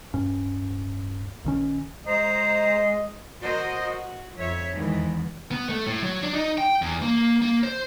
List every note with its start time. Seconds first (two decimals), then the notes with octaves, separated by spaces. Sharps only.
0.14 D1 G2 C#4
1.44 A#1 D#3 C#4
2.07 G#3 C5 D#5 A#5 C7
3.42 F#4 A#4 C5 D#5
3.83 F#4
4.36 F2 C#5 E5
4.73 E2 G#2 D#3 E3
5.51 B3
5.69 A3
5.87 A2
6.03 F#3
6.23 D4
6.34 D#4
6.58 G5
6.82 E2
7.02 A#3
7.42 A#3
7.64 C5